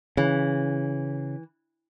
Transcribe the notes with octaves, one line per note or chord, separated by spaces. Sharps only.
C#3 E3